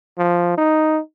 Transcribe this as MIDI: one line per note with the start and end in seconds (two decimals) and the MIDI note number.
0.18 0.53 53
0.58 1.00 63